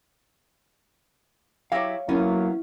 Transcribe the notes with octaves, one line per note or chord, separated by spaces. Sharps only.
F#3 E4 G4 C#5 F5
F#3 A#3 B3 C#4 E4 F4